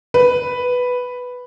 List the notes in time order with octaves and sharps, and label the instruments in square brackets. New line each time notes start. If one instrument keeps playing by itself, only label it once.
[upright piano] B4